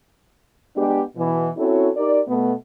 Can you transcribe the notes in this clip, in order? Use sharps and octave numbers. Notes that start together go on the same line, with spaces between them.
G#3 B3 D4 G4
B2 E3
C4 C#4 E4 F#4 A4 C#5
D#4 G4 A#4 D5
B2 A3 B3